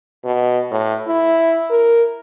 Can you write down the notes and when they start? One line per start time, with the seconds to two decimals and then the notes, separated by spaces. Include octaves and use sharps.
0.24 B2
0.71 A2
1.07 E4
1.70 A#4